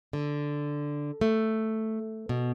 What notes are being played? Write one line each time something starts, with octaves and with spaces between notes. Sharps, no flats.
D3
A3
B2